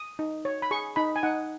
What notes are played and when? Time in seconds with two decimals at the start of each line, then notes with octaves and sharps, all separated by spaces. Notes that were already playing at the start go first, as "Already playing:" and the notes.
Already playing: D#6
0.19 D#4
0.45 C#5
0.62 B5
0.71 G#4 C#6
0.96 D#4 B5
1.16 G#5
1.23 D#4 F#5